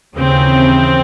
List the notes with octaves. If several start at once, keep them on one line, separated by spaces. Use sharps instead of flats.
D#2 C#3 E3 C4